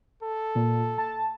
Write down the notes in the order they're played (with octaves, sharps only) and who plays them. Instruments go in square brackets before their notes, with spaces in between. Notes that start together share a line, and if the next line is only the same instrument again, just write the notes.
[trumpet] A4
[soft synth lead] A#2
A5